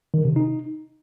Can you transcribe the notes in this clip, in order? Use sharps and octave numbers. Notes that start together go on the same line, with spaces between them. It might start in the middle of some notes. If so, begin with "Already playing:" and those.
D#3
C3
D#4